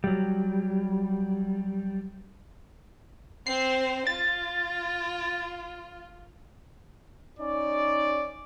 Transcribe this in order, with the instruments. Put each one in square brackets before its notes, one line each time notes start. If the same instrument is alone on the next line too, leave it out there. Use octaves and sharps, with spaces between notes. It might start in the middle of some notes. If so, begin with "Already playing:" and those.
[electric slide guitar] F#3 G3
[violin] C4 C5 [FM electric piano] C7
[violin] F4 [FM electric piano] A6
[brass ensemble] C#4 D#4 D5